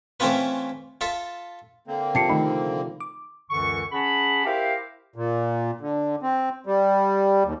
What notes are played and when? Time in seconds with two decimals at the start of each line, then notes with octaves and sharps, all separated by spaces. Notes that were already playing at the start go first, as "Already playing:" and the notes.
0.20 E3 A3 C4 C#4 F4 B4
1.01 F4 A4 E5
1.87 D3 A#3 C4
2.15 C3 F3 A5 C7 C#7
2.29 D#3 A3 D#4 B5
3.00 D6
3.50 C#2 F#2 D3 E3 C#6
3.92 C#4 G#4 F#5 A5 B5
4.45 E4 G4 A#4 C5 E5 F5
5.16 A#2
5.81 D3
6.22 C4
6.66 G3
7.45 D#2